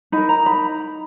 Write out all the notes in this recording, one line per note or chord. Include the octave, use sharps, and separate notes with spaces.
D#4 A#4 B5
A#5
B5